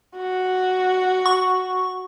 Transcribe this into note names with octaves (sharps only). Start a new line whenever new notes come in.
F#4
C#6